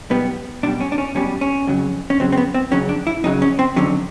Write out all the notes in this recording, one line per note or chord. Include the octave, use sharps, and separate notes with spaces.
B1 B2 G3 B3
B1 B2 G3 D4
C#4
D4
C#4
B1 B2 G3 C#4
C#4
F2 C#3 F#3
C#4
F2 C#3 F#3 C4
C4
B3
C4
F2 C#3 F#3 C#4
D4
E4
F2 C#3 F#3 D#4
C#4
C4
F2 D3 F#3 C#4